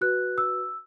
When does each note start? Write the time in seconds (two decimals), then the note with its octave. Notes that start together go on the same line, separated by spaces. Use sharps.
0.01 F#4 B4 F#6
0.38 E6